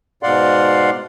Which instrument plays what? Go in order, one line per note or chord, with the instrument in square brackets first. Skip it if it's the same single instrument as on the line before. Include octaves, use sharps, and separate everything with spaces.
[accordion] G#2 B2 D5 F5 F#5 C6